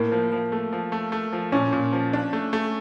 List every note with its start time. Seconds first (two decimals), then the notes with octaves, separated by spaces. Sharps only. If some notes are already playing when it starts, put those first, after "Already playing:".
Already playing: A2 A#3
0.12 F3
0.32 F3
0.52 A3
0.73 F3
0.92 A3
1.12 A3
1.33 F3
1.52 A#2 C#4
1.73 A#2
1.93 F3
2.13 D4
2.33 A3
2.53 A3